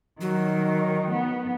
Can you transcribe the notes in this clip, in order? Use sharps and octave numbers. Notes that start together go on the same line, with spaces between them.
D#3 F#3
B3